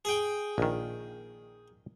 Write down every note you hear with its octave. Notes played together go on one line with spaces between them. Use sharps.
G#4 G5
A#1 D#3